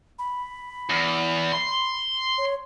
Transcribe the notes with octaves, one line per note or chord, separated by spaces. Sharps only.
B5
E2
C6
C#5